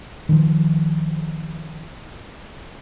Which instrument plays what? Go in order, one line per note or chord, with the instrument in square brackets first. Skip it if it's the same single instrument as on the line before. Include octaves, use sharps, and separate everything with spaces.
[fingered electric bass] D#3 F3